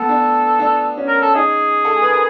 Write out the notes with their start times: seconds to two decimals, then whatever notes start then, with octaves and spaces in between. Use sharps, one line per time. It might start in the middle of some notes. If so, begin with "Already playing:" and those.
Already playing: B3 A4
0.09 D4
0.59 D4
0.97 C#4
1.07 A#4
1.22 A4
1.35 D#4 G#4
1.85 A4
2.02 B4
2.10 A#4